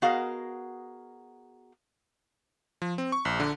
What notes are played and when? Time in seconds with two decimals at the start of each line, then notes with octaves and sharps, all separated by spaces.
0.02 B3 F#4 G#4 A#4 D#5 F5
2.82 F3
2.98 C4
3.12 C#6
3.25 A#1
3.40 D3